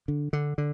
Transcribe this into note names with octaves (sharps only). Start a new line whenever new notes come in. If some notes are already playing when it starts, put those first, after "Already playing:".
D3
D3
D3